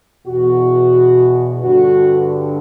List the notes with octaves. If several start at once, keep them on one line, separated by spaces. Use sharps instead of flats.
E2 B2 F#4
G2 D3 F#4